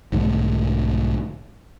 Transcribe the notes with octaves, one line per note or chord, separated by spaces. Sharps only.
B1 G#2 D3 A3